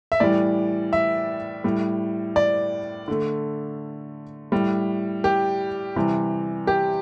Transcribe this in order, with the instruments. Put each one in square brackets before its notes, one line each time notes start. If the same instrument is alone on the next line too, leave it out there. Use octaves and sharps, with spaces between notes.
[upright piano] E5
A2 E3 G3 D5
E5
A2 G3
D5
D3 A3
A2 G3
G4
C3 E3 G3
G4